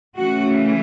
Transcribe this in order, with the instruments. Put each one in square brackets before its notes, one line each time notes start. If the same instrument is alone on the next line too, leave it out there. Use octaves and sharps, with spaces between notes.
[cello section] C#3 E3 A3 C#4 F#4